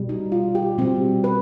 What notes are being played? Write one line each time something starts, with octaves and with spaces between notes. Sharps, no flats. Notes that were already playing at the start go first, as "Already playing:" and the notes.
Already playing: B2 G3
D#4
F4
G4
B2 G3 C4
B4